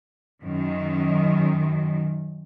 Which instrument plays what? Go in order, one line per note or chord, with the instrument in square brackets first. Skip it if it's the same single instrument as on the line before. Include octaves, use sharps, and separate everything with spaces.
[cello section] F#2 D#3